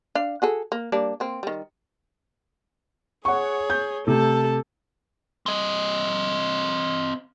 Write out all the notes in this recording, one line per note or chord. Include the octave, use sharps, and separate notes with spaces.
D4 F5
F#4 G#4 A4
A#3
G3 A#3 D4
A#3 C4
D#3 G3
G#4 C#5 F#5 C#6
G6
C3 A3 A4 A5
C4 D#5